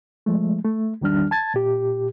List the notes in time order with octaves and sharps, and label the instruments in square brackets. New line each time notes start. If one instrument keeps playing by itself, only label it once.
[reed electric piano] F3 G#3 A3
A3
E2 D#3 G3 D4 F6
A5 G#6 A6
A#2 G4